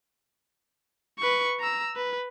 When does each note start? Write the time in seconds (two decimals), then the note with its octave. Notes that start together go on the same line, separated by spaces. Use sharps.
1.19 B4 C#6
1.60 A#5 E6
1.96 B4